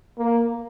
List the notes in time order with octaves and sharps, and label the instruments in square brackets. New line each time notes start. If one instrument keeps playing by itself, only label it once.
[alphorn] A#3